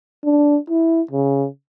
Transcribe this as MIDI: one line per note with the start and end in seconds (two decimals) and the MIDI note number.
0.25 0.57 62
0.70 1.01 64
1.11 1.47 49